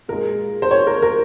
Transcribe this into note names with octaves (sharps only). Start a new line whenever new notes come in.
A#2 G#3 A#4
C5
C#5
A#4
A#4